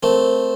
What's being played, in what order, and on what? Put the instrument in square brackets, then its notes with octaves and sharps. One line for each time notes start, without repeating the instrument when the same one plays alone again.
[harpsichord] A3 C4 [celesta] A#4